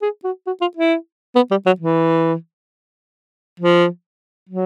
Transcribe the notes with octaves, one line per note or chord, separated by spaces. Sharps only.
G#4
F#4
F#4
F4
E4
B3
G3
F#3
E3
F3
F#3